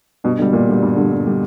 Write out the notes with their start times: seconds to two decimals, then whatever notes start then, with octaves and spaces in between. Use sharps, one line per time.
0.24 G2 B2
0.39 B2 D3 G3
0.53 G2 A#2
0.68 D3 G3
0.83 G2
0.96 D3 G3
1.11 G2
1.26 D3 G3